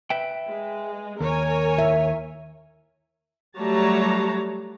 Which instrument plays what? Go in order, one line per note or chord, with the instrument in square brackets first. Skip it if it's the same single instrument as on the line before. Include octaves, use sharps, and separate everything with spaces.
[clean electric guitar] B4 E5 G5
[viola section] G#3
[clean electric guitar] D#2 [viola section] A#4 C#5 G#5
[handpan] E5
[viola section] F#3 G3 A3 C#5 A5 A#5